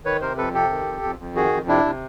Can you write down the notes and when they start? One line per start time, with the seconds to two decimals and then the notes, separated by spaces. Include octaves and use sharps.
0.04 D#3 B4 C#5
0.21 C3 A#4 C5
0.38 F2 A4 B4
0.54 C3 G4 A4
0.70 D#3
0.87 F2
1.03 F2
1.19 F2
1.35 D#3 F#4 G#4
1.52 F2
1.68 C3 D4 E4
1.85 C3